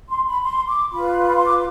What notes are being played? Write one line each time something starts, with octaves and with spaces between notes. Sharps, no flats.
C6
B5
C6
D6
F4 B4 B5
B5
C6
D6